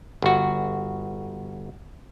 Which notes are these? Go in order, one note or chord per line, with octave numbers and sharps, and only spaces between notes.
G1 F#4